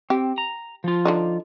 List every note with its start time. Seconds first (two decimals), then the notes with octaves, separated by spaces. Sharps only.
0.10 C4 G4
0.38 A#5
0.84 F3 F4
1.05 D3 D4 D#4